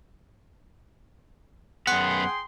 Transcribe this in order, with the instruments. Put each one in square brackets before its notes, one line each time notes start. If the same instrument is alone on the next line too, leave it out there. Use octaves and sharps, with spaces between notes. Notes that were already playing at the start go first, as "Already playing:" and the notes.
[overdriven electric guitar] F#2 B3 [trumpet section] G#4 G5 C6 [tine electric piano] F#5